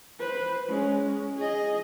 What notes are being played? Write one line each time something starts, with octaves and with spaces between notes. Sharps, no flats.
B4 C5
G#3 C#4
G#4 D#5